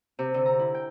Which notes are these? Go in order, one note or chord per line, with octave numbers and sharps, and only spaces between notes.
C3
D3
A#5
E4
G5